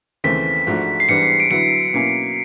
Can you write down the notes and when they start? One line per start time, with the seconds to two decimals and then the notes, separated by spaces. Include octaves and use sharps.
0.24 D#2 C#3 E3 A3 C4 B6
0.67 G#2 F3 A3 D4 F#4
1.00 C7
1.09 G#2 E3 G3 B3 D4 C#7
1.40 D7
1.51 D3 F#3 B3 E4 C#7
1.93 B2 F#3 A#3 C#4 E4